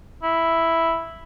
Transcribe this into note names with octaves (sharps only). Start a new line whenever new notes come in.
E4